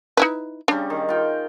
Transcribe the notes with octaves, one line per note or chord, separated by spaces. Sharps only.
D#4 E4 B4
C#3 G3 D4
D#3
F4 G5